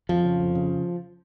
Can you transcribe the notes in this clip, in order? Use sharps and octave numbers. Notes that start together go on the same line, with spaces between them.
F2 F3
C#3
F2
C#3